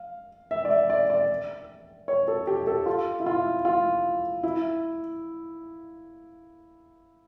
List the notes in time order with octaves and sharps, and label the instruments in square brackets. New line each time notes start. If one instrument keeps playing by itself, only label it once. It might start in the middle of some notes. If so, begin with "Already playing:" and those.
Already playing: [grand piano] F5
E5
D5
E5
D5
D5
C#5
A4
G4
A4
F4
E4
F4
F4
E4